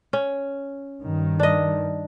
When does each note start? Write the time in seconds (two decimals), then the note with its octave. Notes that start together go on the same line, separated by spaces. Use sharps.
0.13 C#4
1.02 G2 D#3
1.40 D4 D#5